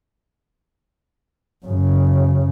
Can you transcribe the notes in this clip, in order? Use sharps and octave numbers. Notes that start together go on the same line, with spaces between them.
F#2 C#3